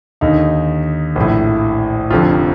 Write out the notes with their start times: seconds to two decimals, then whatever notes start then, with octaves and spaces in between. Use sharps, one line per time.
0.21 D#2 D3 D#4
1.16 A#1 A2
2.10 F1 F2 D3 F4